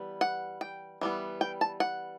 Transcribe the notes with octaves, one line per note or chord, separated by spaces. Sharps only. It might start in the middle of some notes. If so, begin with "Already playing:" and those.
Already playing: E3 G3 B3
F#5
G5
E3 G3 B3
G5
A5
F#5